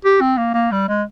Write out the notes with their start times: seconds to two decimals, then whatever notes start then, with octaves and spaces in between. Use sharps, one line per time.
0.05 G4
0.21 C4
0.38 A#3
0.54 A#3
0.72 G3
0.88 G#3